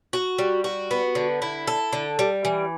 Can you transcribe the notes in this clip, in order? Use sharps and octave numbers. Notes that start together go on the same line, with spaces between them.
F#4
G3
F#4
B3
D3
E4
A4
D3
G3
E3